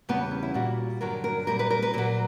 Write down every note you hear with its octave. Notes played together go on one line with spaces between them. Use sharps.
E2 C#3 E3 G3 B3
C#4
E4
A#2 G3 F#4
G2 D3 F#3 A#4
A#4
A#2 G3 A#4
B4
A#4
B4
A#2 F#3 A#4